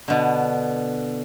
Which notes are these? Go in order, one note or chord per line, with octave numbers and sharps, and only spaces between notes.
B2 D3